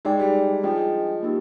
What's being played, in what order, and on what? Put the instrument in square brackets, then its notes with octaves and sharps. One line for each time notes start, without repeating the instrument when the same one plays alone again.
[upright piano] G#3 [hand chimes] D#4 G#4 D5 G5
[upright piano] G3
[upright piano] F3 [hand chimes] D4 G#4 D#5 G5
[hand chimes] A#3 D#4 G4